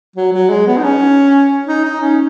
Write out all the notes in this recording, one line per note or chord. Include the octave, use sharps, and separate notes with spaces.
F#3
F#3
G#3
B3
D#4
C#4
D#4
D#4
C#4